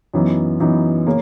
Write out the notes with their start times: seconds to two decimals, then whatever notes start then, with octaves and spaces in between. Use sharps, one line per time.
0.14 F#2 E3 B3 D#4
0.60 F#2 E3 B3 D#4
1.07 C#3 A#3 C#4